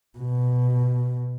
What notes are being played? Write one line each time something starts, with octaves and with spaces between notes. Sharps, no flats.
B2